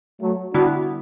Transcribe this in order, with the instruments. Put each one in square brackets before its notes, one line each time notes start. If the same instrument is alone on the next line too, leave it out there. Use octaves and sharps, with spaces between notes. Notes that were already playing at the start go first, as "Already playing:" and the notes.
[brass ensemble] F#3 A3
[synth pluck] D3 G3 B3 E4 [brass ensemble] D4 F#4